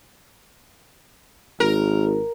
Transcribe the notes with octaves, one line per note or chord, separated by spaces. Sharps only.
G#1 A#4